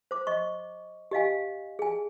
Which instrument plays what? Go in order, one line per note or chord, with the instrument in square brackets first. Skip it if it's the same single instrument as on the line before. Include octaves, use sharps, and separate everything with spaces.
[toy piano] C5 D6
D#5 C#6
G4 D#5 F5 G#5
G#4 G#5